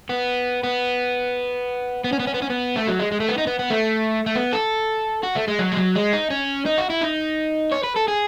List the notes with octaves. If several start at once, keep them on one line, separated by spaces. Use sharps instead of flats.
B3
B3
B3
C#4
B3
C#4
B3
C#4
B3
A3
F#3
G#3
G#3
A3
B3
D#4
B3
B3
A3
A3
B3
A4
F#4
A3
G#3
F#3
G#3
F#3
G#3
D#4
C#4
D#4
F#4
E4
D#4
C#5
B4
A4
G#4